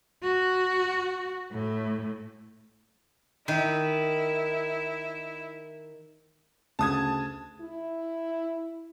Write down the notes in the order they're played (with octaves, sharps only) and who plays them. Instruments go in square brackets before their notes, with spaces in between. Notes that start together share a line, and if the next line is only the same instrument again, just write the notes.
[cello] F#4
A2
[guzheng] D#3 [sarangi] E4
[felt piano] D2 C#3 [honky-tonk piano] A5 D#6 G#6
[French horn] E4